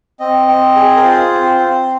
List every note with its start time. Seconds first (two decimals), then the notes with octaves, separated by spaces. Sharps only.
0.19 C4 D#5
0.48 C4
0.76 G#4
0.96 A#4
1.03 F4 C5
1.31 C4
1.59 C4